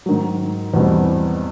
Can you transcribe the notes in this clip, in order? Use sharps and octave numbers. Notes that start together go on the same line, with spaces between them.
G#2 D#3 F#3
E2 B2 G3 C4